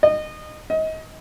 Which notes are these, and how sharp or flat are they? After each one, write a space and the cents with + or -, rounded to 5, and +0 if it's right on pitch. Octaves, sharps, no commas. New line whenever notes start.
D#5 -20
D#5 +30